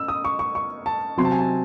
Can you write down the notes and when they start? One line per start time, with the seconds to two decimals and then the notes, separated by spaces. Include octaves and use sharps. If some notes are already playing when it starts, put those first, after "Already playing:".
Already playing: C#4 E6
0.08 D#6
0.25 C#6
0.39 C#6
0.55 C#6
0.86 A5
1.17 C3 F#3 C4 C6
1.25 A5
1.32 G#5
1.39 A5